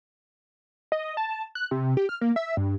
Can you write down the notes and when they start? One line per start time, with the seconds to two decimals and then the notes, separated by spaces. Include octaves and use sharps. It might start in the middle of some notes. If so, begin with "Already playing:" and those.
0.92 D#5
1.17 A5
1.55 F#6
1.71 C3
1.97 G4
2.09 F6
2.21 A#3
2.36 E5
2.57 G2